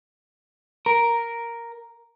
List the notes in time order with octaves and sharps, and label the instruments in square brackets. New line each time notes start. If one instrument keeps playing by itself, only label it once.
[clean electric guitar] A#4